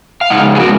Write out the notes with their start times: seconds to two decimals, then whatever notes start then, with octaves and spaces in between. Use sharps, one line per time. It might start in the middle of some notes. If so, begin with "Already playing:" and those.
0.21 F5
0.30 C#3 G#3 D#4 D#5 F#5
0.55 G#4
0.60 F#4 A#4